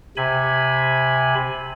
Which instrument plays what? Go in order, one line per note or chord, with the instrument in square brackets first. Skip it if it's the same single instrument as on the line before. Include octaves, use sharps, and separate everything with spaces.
[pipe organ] C3 G#5 B5